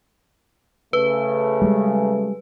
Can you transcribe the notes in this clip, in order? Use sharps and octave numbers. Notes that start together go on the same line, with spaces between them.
C#3 A3 B4
G3 G#3